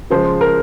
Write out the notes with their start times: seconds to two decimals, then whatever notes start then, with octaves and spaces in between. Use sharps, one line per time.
0.10 C#3 F3 G#3 C5
0.41 A#4